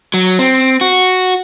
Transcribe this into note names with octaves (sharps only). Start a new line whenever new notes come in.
F#3
C4
F#4